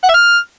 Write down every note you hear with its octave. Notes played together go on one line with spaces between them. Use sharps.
F#5
E5
F6